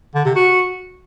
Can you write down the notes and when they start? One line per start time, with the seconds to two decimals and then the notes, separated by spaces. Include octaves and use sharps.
0.15 D3
0.25 C3
0.36 F#4